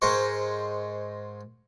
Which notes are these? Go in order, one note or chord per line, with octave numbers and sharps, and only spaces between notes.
G#2 G#3 A#4 C5 C#6